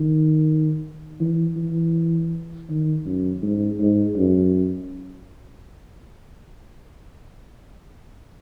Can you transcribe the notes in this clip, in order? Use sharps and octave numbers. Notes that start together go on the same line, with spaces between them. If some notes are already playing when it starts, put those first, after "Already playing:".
Already playing: D#3
E3
E3
D#3
F#2
G#2
G#2
F#2